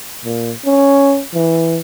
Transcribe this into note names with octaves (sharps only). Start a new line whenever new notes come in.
A#2
C#4
E3